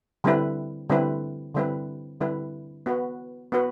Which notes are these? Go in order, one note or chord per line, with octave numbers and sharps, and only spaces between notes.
D3 G3 C4 E4 B4
D3 G3 C4 E4 B4
D3 G3 C4 E4 B4
D3 G3 C4 E4 B4
B3 F#4 B4
B3 F#4 B4